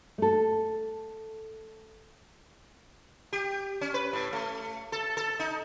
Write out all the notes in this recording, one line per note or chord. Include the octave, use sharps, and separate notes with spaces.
A3 A4
G4
C#4
B4
A2
A3
A4
A4
D#4